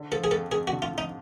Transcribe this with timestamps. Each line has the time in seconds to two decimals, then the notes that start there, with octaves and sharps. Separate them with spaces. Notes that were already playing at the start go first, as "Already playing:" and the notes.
Already playing: D3
0.12 F3 A4
0.24 G#4
0.31 F2 A4
0.52 F2 G#4
0.67 D3 F#4
0.82 F4
0.94 F3 D#4